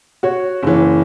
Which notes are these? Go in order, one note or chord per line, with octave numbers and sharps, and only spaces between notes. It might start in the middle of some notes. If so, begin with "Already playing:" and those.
F#4 C#5
F#1 E3